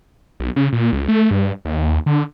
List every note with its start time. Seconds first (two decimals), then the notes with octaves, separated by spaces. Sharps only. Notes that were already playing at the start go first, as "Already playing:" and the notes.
0.40 B1
0.56 C#3
0.73 A#2
0.93 C#2
1.08 A3
1.31 G2
1.65 D#2
2.06 D3